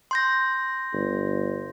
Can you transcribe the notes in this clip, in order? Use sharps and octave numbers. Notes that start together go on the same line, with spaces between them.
C6 G6 A#6
G1